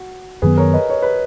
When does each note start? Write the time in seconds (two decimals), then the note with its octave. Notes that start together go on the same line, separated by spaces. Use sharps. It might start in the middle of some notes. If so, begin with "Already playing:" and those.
Already playing: F#4
0.42 F#2 D#3 F#3 B3 G#4 B4
0.58 A#4 C#5
0.74 B4 D#5
0.90 C#5
1.02 B4